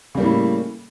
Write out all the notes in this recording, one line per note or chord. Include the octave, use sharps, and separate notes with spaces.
A2 C#3 G3 A#3